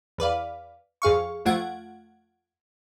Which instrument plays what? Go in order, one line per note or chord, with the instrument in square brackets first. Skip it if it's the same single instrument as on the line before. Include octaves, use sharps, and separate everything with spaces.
[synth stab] E2 B4 D5 F5
F2 G#4 F5 C#6
F2 A3 F4 F#5 G#6 D7